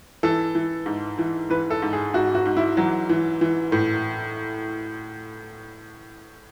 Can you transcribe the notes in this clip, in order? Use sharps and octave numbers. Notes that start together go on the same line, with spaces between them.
E3 A4
E3
G#2
E3
E3 B4
A4
G#2
G#4
G#2 F#4
F#4
G#2
E4
E3 F#3
E3
E3
A2